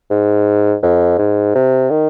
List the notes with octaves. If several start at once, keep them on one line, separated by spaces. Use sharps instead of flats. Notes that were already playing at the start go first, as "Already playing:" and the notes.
G#2
F2
G#2
C3
D#3